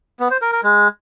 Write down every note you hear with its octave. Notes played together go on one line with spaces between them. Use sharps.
B3
C5
A#4
A#4
G#3